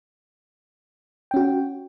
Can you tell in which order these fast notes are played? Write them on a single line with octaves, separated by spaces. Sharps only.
G5 C#4 F#4